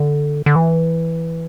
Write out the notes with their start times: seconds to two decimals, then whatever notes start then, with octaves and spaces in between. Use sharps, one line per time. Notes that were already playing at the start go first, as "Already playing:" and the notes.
Already playing: D3
0.46 D3
0.56 E3